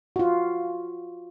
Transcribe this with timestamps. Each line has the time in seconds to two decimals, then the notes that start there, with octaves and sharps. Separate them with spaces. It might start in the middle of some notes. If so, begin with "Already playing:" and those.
0.16 F4 F#4